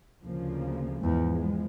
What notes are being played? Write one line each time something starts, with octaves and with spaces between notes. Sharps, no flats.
D2 C#3 F3 A#3
E2 G#2 F3 G#3 B3